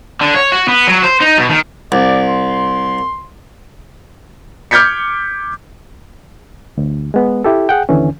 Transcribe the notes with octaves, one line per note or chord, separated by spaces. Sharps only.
D3
C#5
F#4
B3
F#3
C5
D#4
B2
D#3
C2 D5
C6
D6 F6 G6 G#6 B6 C#7
D2
G#3 B3
E4 G4 A4
G#4 F#5 G5
D#2 D3 E3 C#4